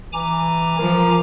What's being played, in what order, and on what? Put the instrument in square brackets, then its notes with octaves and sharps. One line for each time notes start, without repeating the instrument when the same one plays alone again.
[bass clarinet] E3 [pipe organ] G#5 A#5 D6
[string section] F3 [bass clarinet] A#4